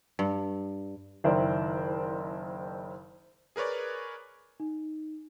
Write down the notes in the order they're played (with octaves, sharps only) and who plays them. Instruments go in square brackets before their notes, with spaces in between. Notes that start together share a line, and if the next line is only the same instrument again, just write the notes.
[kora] G2
[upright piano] F#1 D#3 E4 A#4 C5 D5
[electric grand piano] G#4 A#4 B4 C#5 D5
[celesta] D#4